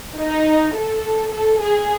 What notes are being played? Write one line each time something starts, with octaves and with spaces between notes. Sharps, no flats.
D#4
A4
A4
G#4